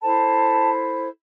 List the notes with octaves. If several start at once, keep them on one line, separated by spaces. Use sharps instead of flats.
E4 A4 C5 A5